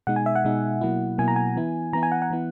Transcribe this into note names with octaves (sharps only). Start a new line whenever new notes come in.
B2 G#3 D#4 F#5
G#5
E5
F#5
B2 G#3 D#4
B2 F#3 A#3 E4
B2 F#3 A#3 E4 G#5
A#5
G#5
E3 B3 E4
E3 B3 E4 A#5
G#5
F#5
F#5
E3 B3 E4